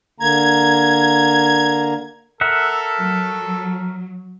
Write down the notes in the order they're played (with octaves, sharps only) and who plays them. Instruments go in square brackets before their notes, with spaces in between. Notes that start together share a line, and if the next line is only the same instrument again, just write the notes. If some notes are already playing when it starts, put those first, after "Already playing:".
[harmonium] D3 A#3 A#5 [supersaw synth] G#6
[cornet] A4 [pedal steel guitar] A#4 E5 F#5
[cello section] F#3